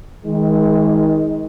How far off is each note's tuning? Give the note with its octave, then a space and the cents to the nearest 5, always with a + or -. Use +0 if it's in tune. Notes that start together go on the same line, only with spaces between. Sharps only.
D#3 +30 G#3 +0